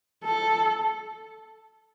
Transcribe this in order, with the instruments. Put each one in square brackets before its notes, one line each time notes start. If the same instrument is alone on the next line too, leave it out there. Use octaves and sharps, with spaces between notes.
[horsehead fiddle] A4